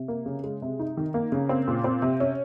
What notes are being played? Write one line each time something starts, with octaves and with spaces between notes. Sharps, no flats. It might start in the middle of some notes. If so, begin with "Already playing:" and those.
Already playing: C3
A#3
C#3
G#3
C3
D#4
D#3
A#3
C#3
C4
A#2
C4
C3
C#4